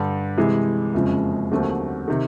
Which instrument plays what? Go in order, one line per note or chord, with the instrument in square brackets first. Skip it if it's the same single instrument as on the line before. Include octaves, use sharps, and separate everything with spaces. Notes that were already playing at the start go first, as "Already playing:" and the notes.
Already playing: [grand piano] G2 D3 G3
C3 E3 G#3
F#1 F2 C#3 F3 G#3
D#2 D3 F#3 A3 C4
C3 D#3